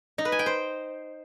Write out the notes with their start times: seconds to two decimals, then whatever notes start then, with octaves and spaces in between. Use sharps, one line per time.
0.18 D#4
0.25 B4
0.32 G#5
0.39 G5
0.46 C5